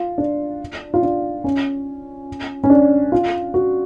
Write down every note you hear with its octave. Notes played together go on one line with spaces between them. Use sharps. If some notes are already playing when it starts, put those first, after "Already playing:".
Already playing: F4
D4
F4
D4
C#4
C#4
D4
F4
F#4